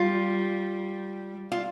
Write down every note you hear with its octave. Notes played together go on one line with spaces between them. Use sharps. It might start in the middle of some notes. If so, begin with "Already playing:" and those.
Already playing: G3 F4
F4